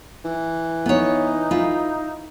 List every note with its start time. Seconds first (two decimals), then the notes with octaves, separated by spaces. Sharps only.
0.25 E3
0.86 B3 D#4 C#5
1.51 E4 F4 B4